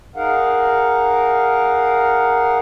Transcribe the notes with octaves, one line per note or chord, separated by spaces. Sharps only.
D#4 G#4 A#4 F5 F#5